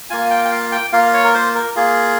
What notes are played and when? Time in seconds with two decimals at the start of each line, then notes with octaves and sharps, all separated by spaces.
0.10 A#3 F4 G#5
0.30 G5
0.45 G5
0.51 F5
0.72 G5
0.93 A#3 F4 F5
1.14 C#5
1.24 A#4
1.34 C5
1.55 A#4
1.76 A#3 F4 G#4